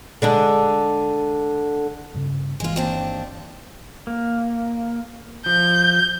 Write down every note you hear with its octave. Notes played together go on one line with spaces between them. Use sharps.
D3 G#3 D4
G2 C#3
G1 E3 G#3 F4
D#2 C4 D4
A#3
F3 G6